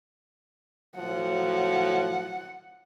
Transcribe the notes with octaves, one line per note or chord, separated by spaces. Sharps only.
A2 F3 F#3 F#5